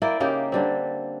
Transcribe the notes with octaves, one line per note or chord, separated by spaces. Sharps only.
A#3 E4 D5 G5
C#3 A#3 D#4 G4
D3 G3 C4